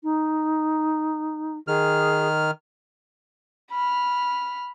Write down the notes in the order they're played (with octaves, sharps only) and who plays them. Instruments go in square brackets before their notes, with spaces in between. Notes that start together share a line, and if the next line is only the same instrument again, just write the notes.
[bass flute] D#4
[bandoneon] D#3 F6 [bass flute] G#4
[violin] B5 F6